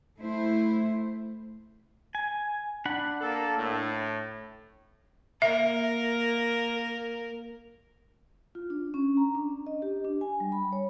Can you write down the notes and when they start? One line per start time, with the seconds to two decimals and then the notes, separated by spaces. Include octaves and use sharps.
0.18 A3 E4 C5
2.15 G#5
2.85 D4 F#5 B5
3.21 A#3 A4
3.57 A2
5.42 A#3 A#4 E5
8.55 F4
8.70 D4
8.94 C#4
9.17 A#5
9.35 D4
9.67 D#5
9.82 G4
10.04 D4
10.21 G#5
10.40 G3
10.52 B5
10.72 C#5